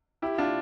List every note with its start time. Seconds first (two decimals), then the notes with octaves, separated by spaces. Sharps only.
0.22 E4 G4
0.38 D4 F4